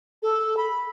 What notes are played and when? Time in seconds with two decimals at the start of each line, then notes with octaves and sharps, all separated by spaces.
0.23 A4
0.57 B5